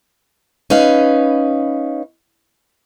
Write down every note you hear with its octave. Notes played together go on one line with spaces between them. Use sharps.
C#4 D#4 B4 F5